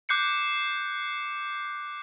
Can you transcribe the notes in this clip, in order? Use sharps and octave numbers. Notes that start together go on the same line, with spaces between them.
D6 F#6 G6 C7 C#7